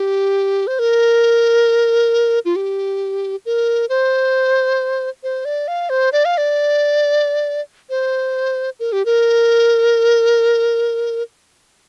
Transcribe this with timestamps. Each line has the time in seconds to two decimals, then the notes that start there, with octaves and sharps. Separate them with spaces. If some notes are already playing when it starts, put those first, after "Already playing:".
Already playing: G4
0.67 C5
0.79 A#4
2.45 F4
2.56 G4
3.46 A#4
3.89 C5
5.23 C5
5.45 D5
5.68 F5
5.90 C5
6.13 D5
6.25 F5
6.38 D5
7.90 C5
8.80 A#4
8.92 G4
9.05 A#4